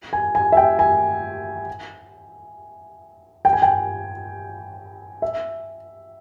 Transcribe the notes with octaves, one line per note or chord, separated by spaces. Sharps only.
G#5
G#5
E5
G5
G#5
G5
G#5
G5
E5